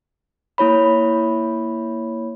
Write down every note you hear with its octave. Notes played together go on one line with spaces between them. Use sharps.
A#3 E4 C#5 B5